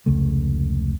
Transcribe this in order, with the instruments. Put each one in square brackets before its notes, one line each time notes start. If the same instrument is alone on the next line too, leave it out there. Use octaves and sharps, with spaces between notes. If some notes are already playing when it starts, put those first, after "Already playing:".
[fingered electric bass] F1 C#2 C#3 A3